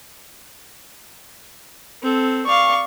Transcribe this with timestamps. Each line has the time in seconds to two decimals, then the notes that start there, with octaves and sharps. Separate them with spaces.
2.02 C4 A4
2.46 D5 F5 C#6